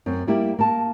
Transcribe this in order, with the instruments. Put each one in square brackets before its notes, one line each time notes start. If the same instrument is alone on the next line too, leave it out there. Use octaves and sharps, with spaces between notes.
[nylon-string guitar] F#2 C4
G3 A#3 E4 G4
A#3 A5